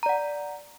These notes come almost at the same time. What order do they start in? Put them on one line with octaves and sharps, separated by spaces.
A#5 D5 F#5